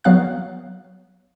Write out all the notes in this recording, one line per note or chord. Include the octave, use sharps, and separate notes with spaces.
F#3 B3 F5 F#6